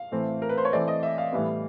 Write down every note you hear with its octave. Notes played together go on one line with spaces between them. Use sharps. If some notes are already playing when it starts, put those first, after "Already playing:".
Already playing: F5
A2 E3 A3 C4
A#4
B4
C5
C#5
E3 A3 C4 D5
D#5
E5
F5
A2 E3 G3 B3